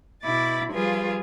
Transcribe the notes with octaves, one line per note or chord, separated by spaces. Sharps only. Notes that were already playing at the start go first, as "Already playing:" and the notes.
B2 E4 B5 D6 A6
F3 G3 F4 G#4 B4